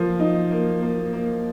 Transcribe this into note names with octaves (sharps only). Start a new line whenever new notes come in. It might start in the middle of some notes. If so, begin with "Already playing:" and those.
Already playing: F3 A#3
D#4
A#3
A#3
A#3